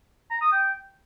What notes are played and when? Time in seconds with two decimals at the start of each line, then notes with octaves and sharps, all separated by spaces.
0.30 A#5
0.41 D#6
0.52 G5